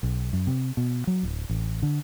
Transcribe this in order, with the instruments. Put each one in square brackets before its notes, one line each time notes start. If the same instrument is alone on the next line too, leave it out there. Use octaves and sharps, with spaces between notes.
[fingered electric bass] B1
F#2
C3
B2
F#3
D1
A1
D3